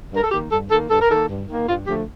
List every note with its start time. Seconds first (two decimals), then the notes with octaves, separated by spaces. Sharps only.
0.12 G2 A#4
0.23 A4
0.31 D#3 A#3 G4
0.51 G2 A4
0.70 D#3 A#3 A4
0.89 G2 A4
1.01 A#4
1.09 D#3 A#3 A4
1.29 G2
1.47 D#3 A#3
1.67 G2 F4
1.87 D3 F3 A3 G4